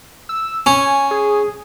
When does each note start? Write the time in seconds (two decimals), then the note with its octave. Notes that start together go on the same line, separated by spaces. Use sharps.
0.29 E6
0.66 C#4 G#5
1.11 G#4